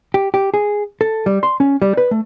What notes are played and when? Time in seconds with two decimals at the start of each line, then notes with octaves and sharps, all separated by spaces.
0.14 G4
0.34 G4
0.54 G#4
1.01 A4
1.26 G3
1.43 C6
1.60 C#4
1.82 G3
1.97 B4
2.11 A3